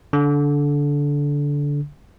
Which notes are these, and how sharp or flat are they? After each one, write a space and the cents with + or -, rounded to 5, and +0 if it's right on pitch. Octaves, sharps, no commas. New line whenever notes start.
D3 -20